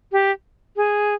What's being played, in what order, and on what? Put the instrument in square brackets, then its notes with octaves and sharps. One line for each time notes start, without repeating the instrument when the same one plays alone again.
[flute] G4
G#4